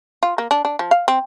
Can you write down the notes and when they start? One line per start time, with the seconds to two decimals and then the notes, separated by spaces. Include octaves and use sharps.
0.23 F4
0.38 A#3
0.51 D4
0.65 D4
0.79 F3
0.91 F5
1.08 C4